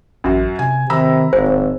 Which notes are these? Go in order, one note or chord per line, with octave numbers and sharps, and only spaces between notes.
A1 F#2 F#4
C3 G#5
C3 D#3 A#5 B5 E6
D1 G#1 C5